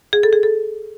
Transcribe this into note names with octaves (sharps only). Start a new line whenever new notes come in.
G#4
A4
G#4
A4